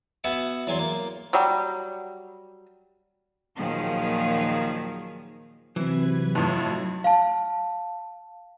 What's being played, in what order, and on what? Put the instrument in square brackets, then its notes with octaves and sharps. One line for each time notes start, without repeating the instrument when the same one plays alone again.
[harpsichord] B3 F#4 E5 F#5 G#5
E2 F#3 G#5 C6
A#3
[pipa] F#3 G3
[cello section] D#2 A#2 D#3 F3 F#3 G#4
[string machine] C3 B4 G#6 [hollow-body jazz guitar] E3 [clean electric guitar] F#3 C4
[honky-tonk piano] F2 A2 [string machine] F#3 [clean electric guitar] D#4
[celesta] F5 A5